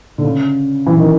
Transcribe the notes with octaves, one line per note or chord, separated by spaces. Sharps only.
D3
C#3
E3
D#3